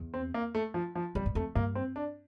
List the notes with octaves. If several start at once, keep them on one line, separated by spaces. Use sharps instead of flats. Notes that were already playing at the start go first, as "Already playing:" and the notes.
Already playing: E2
C4
A#3
A3
F3
F3
F2 G3
G2
F2 A3
G2 A#3
C4
D4